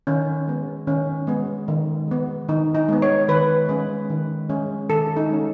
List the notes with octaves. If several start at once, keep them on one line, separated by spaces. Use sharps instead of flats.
D#3 C#4
G#3 B3
D#3 C#4
G#3 B3
D#3
G#3 B3
D#3 D#4
D#4
G#3 B3
C#5
D#3 B4
G#3 C#4
D#3
G#3 C#4
D#3 A4
D#4
G#3 C#4